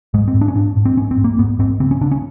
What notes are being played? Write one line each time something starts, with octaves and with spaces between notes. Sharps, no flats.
G#2 G#3
C4
G#2
D4
C#4
G#2 D4
G#2
C4
G#2 C#4
C4
G#2
A#3
G#2 B3
G#2 C4
C#3 C4
C#4
C#3 D4
C#4